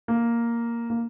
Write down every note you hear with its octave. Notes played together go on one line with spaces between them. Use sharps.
A#3
A#3